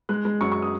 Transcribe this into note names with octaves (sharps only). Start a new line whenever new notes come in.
G#3 F#6
G#3
F#2 C#6
C#6
D#6